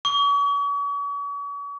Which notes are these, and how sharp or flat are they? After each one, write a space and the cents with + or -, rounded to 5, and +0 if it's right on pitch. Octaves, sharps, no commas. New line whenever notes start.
C#6 +40